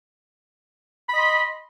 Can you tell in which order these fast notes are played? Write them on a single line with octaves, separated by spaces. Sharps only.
B5 D#5 C6